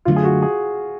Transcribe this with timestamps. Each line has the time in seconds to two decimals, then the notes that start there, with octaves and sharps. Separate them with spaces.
0.05 F#2 D3 F#3 A3 F4
0.16 G#4
0.24 F#4
0.42 G#4